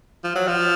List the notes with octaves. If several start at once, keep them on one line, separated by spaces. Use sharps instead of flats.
F3
F#3
F3